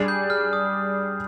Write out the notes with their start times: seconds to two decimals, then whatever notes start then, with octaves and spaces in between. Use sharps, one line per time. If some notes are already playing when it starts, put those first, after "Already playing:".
Already playing: G3 D4 G#4
0.08 G6
0.30 F6
0.53 D#6